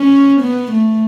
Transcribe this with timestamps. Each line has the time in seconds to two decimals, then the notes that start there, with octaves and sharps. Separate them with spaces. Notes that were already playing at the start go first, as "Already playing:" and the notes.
Already playing: C#4
0.41 B3
0.72 A3